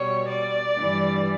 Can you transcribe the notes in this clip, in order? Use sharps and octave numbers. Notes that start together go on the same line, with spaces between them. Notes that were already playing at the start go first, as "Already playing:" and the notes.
Already playing: B2 G3 C#5
D5
G2 E3 G3